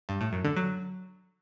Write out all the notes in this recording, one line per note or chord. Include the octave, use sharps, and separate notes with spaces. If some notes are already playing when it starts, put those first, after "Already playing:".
G2
A2
F#2
D3
F#3